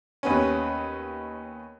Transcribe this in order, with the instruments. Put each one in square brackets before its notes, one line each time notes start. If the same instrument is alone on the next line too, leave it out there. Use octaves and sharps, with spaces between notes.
[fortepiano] D#2 B3 C#4